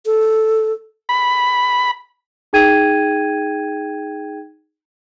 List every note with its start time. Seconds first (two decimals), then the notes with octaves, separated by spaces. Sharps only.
0.06 A4
1.09 B5
2.53 D#4 G#4 G5 G#6 D#7